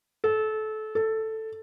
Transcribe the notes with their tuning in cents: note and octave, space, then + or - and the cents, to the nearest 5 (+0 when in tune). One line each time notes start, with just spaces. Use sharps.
A4 -25
A4 +5